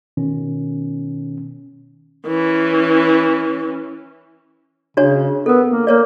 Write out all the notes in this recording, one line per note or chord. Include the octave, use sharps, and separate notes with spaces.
B2 D#3 C#4
E3 C#4
C#3 D4 F#4 C#5
B3 A4 A#4
A#3
A#3 A#4 C#5 D5